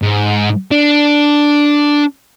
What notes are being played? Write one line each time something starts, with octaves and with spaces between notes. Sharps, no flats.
G#2
D4